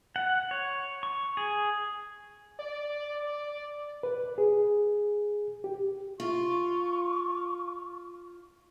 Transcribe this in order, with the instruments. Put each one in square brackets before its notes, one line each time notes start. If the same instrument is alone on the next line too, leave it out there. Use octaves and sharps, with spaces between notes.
[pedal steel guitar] F#5
C#5
C#6
G#4
[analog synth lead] D5
[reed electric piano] B4
G#4
G4
[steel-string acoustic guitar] F4 [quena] C#6